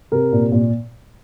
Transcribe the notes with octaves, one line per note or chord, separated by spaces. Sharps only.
C3 A#4
A#2
A#2